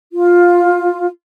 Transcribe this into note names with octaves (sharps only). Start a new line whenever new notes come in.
F4